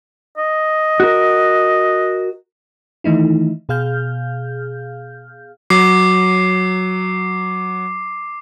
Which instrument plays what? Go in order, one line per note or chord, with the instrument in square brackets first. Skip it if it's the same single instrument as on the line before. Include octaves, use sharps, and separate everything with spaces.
[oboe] D#5
[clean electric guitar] F#4 A#4
[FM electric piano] D#3 E3 A3 D#4 E4
B2 G#4 F5 F6 G6
[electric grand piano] F#3 [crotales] D6 C7